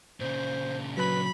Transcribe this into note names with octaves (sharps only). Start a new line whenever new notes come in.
A#2 C#3 C5
F#3 B4 B5